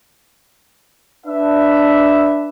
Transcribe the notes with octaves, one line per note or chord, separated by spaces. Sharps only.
D4 B4 E5